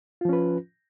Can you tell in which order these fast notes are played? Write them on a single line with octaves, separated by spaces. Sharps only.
F4 F3 C#4 B4